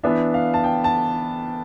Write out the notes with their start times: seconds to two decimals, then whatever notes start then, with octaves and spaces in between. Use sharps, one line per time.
0.03 E3 B3 D4 E5
0.34 F5
0.54 A5
0.64 G5
0.84 A5